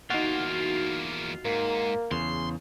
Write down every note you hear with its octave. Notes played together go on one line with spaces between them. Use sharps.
E2 A#3 D#4 F4 F#4
G#2 A#3
E2 C#3 C6